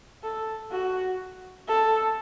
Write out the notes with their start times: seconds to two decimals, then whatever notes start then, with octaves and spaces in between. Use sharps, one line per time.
0.23 A4
0.72 F#4
1.68 A4